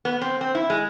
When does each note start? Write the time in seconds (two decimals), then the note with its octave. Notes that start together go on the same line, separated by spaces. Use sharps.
0.05 B3
0.21 C4
0.41 C4
0.55 E4
0.70 G#3